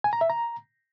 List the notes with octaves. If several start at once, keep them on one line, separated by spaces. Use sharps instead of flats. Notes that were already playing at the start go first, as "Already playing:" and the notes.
G#5
A#5
E5
A#5